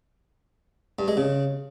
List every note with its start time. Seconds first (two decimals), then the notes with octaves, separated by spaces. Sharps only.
0.99 G2
1.08 G#3
1.17 C#3